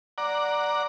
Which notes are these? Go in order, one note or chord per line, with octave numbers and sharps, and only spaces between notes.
D5 F#5 A#5